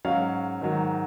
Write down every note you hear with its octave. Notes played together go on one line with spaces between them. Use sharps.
G#2 F#3 C#4 F5
G#2 D#3 F#3